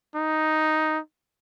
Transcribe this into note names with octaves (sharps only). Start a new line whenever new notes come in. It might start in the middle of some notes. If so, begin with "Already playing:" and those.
D#4